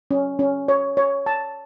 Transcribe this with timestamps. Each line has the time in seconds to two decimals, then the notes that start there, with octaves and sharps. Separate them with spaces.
0.11 C#4
0.39 C#4
0.68 C#5
0.97 C#5
1.26 A5